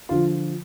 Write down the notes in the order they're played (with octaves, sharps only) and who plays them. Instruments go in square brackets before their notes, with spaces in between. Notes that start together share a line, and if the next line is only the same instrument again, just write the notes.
[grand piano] D3 F3 F4